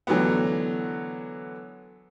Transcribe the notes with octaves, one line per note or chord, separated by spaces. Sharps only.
D3 E3 F#3 A3 B3